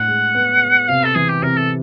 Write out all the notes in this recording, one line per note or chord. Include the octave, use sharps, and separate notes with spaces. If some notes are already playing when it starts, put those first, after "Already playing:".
Already playing: A2 D4 F#5
G#3
B3
B3
C3 F5
A4
E3 G#4
G4
C3 A#4
A4